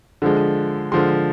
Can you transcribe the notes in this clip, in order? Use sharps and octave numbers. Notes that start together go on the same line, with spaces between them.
D3 F3 G#3
D3 F3 G#3 C6